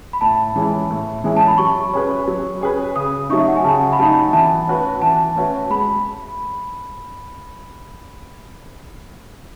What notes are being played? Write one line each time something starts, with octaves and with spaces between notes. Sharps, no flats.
B5
A2 A5
E3 G#3 C#4 E4
A2
E3 G#3 C#4 E4
A5
B5
F#3 C#6
C#4 G#4 B4
F#3
C#4 G#4 B4
C#3 D#6
F#3 A3 D#4 C#6
E5
F#5
G#5
C#3 A5
B5
F#3 A3 D#4 A5
E3 A5
A3 C#4 F#4 B4
E3 A5
A3 C#4 F#4 B4
G#3 B5